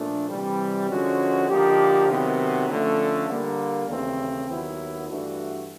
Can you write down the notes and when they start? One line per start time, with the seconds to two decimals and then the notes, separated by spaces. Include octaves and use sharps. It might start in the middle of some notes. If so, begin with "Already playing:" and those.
Already playing: A#2 F3 A3 D4
0.29 C3 E3 G3
0.90 D3 F3 G#3 C#4 F#4
1.48 D3 F3 A#3 D#4 G4
2.08 C3 D#3 F#3 B3
2.69 D3 F3 A3 C#4
3.29 D3 G3 A#3
3.88 D#2 C#3 E3 A3 C4
4.48 D#2 D#3 F#3 B3 E4
5.08 G2 E3 A3 D4 F#4